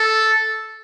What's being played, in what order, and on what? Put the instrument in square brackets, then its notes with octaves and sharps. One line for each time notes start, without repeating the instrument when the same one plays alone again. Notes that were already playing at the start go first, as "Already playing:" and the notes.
Already playing: [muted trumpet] A4